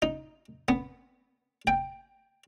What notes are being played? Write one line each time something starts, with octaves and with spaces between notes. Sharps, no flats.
D#4
B3
G5